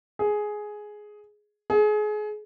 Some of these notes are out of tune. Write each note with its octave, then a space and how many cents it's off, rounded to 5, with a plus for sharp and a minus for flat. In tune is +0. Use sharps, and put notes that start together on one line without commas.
G#4 +10
G#4 +30